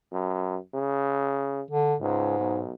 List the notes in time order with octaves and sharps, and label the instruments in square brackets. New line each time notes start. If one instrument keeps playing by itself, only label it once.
[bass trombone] F#2
C#3
[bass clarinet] D3
[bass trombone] C#2 [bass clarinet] G#2
[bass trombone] B1